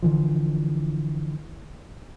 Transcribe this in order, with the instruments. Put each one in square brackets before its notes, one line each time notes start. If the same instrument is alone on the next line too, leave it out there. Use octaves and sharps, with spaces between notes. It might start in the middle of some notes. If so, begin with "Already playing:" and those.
[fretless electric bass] D3 E3 F3